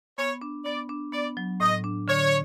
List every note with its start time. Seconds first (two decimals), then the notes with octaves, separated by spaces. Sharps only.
0.18 B3 C#5
0.42 D4
0.65 B3 D5
0.89 D4
1.12 B3 D5
1.37 F#3
1.60 A2 D#5
1.84 D4
2.08 D3 C#5